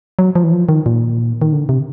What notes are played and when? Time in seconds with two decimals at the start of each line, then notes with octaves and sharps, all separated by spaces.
0.19 F#3
0.35 F3
0.43 E3
0.52 F3
0.69 D#3
0.86 A#2
1.42 D#3
1.53 D3
1.69 C3